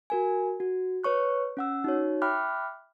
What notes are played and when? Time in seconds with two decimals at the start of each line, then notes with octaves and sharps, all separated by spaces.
0.10 F#4 A#4 G#5
0.60 F#4
1.04 B4 C#5 C#6 F#6
1.57 C#4 F#5 E6
1.84 D#4 F#4 C#5
2.22 E5 G5 B5 D6 F6 F#6